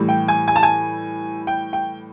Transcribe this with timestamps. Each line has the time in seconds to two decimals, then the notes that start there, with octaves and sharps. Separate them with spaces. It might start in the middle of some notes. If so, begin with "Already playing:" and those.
Already playing: A2 E3 G3
0.09 G5
0.28 G#5
0.48 G#5
0.56 A5
0.63 G#5
1.47 G5
1.73 G5